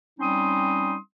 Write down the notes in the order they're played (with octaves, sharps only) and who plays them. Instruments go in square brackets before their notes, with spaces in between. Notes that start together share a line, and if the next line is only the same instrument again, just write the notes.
[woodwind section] G3 C4 C#4 D#4 C6 D#6